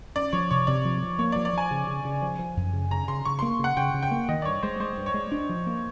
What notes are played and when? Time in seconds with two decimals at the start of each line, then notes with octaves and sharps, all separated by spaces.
0.15 C#4 D5
0.33 F3 C#5
0.51 C3 C#5
0.67 C3 D5
0.85 F3
1.02 F3
1.19 A#3 C#5
1.32 F3 D5
1.45 D5
1.53 F3 G#5
1.71 C#3
1.87 C#3
2.05 C#3
2.22 F3
2.39 F3
2.57 F#2
2.73 C#3
2.91 C#3 A#5
3.08 C#3 C6
3.25 C#3 C#6
3.39 A#3 C6
3.59 C#3 F#5
3.77 C#3 G5
3.94 C#3
4.03 G5
4.11 A#3
4.29 D#3 D#5
4.42 D5
4.45 G2 C#5
4.63 G#3 C5
4.80 G#3 C5
4.97 G2
5.06 C#5
5.14 G#3
5.32 D4
5.49 F3
5.67 A#3